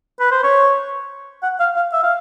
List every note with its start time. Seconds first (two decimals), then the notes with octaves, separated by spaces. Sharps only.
0.20 B4
0.31 C5
0.43 C#5
1.43 F#5
1.59 F5
1.76 F5
1.93 E5
2.03 F5